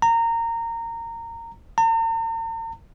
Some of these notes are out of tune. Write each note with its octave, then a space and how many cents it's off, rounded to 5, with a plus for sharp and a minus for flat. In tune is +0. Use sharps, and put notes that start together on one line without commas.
A#5 -20
A#5 -45